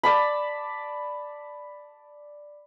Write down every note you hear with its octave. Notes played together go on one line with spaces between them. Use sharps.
D5 A5 B5